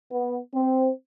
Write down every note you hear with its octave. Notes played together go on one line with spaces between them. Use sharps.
B3
C4